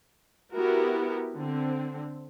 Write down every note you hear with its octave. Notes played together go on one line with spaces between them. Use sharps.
B3 E4 F#4 G4 A#4
D3 C4